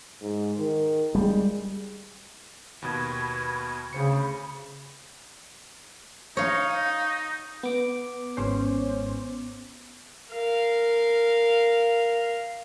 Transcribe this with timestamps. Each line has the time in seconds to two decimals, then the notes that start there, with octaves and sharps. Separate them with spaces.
0.22 G#2
0.59 D#3
1.15 G3 G#3
2.82 D#2 B2 B5 C#6 G#6
3.93 D2 C#3 C5 B5 C#7
6.37 D#4 C#5 F5
7.63 B3 D6
8.37 G#1 C#4 C5
10.32 A#4 F5